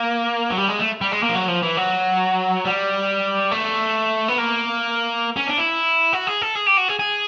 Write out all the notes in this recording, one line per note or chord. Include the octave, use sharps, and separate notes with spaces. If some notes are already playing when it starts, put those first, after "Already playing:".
Already playing: A#3
F#3
G3
G#3
A3
G3
G#3
A#3
F3
F#3
F3
E3
F#3
G3
A3
B3
A#3
C#4
D4
E4
F#4
G#4
A4
G#4
G4
F#4
G#4
G#4